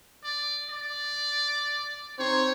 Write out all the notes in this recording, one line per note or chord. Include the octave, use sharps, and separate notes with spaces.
D5
D5
C4 D#4 C5 C#5